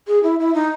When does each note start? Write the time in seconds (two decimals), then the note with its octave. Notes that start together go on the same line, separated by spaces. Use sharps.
0.08 G#4
0.23 E4
0.40 E4
0.54 D#4